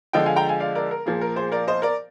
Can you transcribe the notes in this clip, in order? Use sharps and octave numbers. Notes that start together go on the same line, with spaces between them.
D3 F3 G#3 D#5 G5
F5 G#5
G5 A#5
F5 G#5
D5 F5
A#4 D5
A#4
A#2 F3 A#3 G#4
A#4
G#4 C5
A#4 D5
C5 D#5
A#4 D5